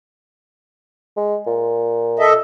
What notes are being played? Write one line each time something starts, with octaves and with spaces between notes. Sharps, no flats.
G#3
A#2
A4 D#5 E5